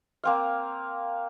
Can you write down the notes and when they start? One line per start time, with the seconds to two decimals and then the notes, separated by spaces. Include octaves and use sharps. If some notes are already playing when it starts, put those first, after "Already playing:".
0.24 A#3 C4 F5